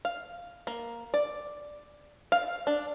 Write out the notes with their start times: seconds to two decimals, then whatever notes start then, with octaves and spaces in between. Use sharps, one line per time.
0.05 F5
0.67 A#3
1.14 D5
2.32 F5
2.67 D4